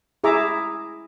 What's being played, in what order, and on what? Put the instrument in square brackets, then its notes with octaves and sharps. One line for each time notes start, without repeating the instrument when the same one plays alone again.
[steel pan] E4 G#4 E5 A#5 D6